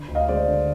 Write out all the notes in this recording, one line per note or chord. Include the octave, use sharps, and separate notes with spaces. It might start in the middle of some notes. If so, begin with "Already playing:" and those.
Already playing: D3
D2
D#5 F5
G#3 C5 D5
D3